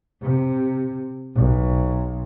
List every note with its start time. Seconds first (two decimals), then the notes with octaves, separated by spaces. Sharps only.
0.22 C3
1.35 B1